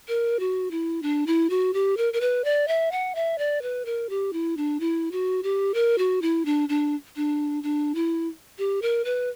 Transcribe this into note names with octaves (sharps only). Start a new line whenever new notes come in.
A#4
F#4
E4
D4
E4
F#4
G4
A#4
A#4
B4
D5
E5
F#5
E5
D5
B4
A#4
G4
E4
D4
E4
F#4
G4
A#4
F#4
E4
D4
D4
D4
D4
E4
G4
A#4
B4